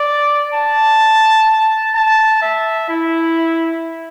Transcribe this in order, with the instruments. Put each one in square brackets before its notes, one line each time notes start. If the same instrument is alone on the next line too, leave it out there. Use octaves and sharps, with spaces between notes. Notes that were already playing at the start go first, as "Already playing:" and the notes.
Already playing: [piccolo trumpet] D5
A5
A5
E5
E4